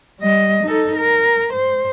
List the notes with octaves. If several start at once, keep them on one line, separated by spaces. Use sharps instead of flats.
G3 D#5
D#4 A4
A#4
C5